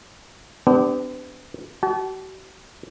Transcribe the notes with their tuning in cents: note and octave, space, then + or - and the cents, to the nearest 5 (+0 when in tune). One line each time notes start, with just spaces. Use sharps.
B3 +45 D4 +0 G4 +0
F#4 +45 A5 -30